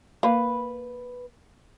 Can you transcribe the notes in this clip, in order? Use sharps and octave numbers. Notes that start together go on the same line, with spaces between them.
A#3 B4